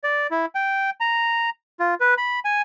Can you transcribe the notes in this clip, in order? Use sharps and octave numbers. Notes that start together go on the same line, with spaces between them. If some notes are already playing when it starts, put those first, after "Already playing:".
D5
E4
G5
A#5
F4
B4
B5
G#5